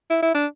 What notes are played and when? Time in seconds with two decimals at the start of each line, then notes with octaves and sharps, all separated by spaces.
0.10 E4
0.22 E4
0.35 D4